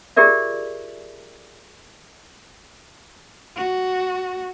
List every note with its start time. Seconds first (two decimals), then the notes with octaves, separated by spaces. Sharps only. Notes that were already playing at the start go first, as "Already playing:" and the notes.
0.16 F4 G4 G#4 A#4 D5 E5
3.56 F#4